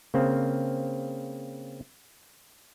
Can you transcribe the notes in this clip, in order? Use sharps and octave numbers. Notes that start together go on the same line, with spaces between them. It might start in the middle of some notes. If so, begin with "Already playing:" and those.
C#3 A#3 C4